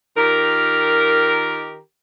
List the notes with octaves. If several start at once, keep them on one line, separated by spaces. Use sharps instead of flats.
D#3 F4 G4 A#4